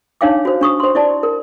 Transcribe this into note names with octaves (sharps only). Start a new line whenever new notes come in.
D4 D#4 C#5 F5 G5 D6
F#4 C5
D4 C#6 D#6
C5 C6
E4 D5 A5
A#4